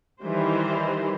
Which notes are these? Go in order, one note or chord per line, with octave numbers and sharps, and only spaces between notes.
D#3 E3 G3 C5